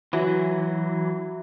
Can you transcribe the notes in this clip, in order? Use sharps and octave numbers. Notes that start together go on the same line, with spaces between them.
E3 F#3 F#4 E5